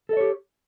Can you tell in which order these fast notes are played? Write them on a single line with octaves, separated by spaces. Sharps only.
A4 D#5 C#5 G4